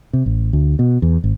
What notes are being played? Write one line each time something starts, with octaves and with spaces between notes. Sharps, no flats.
C3
A1
D2
B2
E2
G#1